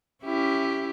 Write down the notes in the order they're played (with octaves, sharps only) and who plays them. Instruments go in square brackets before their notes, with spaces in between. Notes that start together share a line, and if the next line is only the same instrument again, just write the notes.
[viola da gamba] C#4 E4 G4